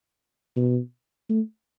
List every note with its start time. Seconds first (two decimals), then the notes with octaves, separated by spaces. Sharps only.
0.56 B2
1.29 A3